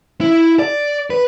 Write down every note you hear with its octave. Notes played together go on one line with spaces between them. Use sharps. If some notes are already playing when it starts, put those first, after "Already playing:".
E4
D5
B4